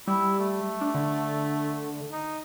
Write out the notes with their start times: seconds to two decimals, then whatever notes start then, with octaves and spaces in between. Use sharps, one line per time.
0.08 G3 E4
0.40 A3
0.81 D4
0.95 D3
2.12 D#4